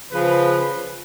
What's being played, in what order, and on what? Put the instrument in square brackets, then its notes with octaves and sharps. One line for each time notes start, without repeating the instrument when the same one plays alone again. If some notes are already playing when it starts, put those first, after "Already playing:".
[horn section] C#3 F3 B4